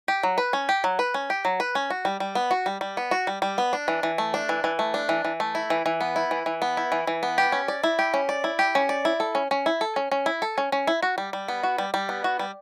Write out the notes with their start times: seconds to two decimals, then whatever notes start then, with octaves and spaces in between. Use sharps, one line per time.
0.08 G4
0.23 F#3
0.38 B4
0.53 C#4
0.69 G4
0.84 F#3
0.99 B4
1.14 C#4
1.30 G4
1.45 F#3
1.60 B4
1.75 C#4
1.90 F#4
2.05 G3
2.20 G3
2.35 B3
2.51 F#4
2.66 G3
2.81 G3
2.97 B3
3.11 F#4
3.27 G3
3.42 G3
3.58 B3
3.73 D4
3.88 E3
4.03 E3
4.18 A3
4.34 D4
4.49 E3
4.64 E3
4.79 A3
4.94 D4
5.09 E3
5.25 E3
5.40 A3
5.55 E4
5.70 E3
5.86 E3
6.01 B3
6.16 E4
6.31 E3
6.46 E3
6.62 B3
6.77 E4
6.92 E3
7.07 E3
7.23 B3
7.38 G4
7.52 C#4
7.68 D5
7.83 E4
7.99 G4
8.14 C#4
8.29 D5
8.44 E4
8.59 G4
8.75 C#4
8.89 D5
9.05 E4
9.20 A4
9.35 C#4
9.51 C#4
9.66 E4
9.81 A4
9.96 C#4
10.12 C#4
10.26 E4
10.42 A4
10.58 C#4
10.72 C#4
10.87 E4
11.02 F#4
11.18 G3
11.33 G3
11.48 B3
11.63 F#4
11.78 G3
11.94 G3
12.09 B3
12.24 F#4
12.39 G3